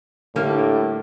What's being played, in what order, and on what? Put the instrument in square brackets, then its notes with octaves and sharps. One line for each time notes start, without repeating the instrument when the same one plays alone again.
[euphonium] A2 [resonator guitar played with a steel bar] D3 G3 A#3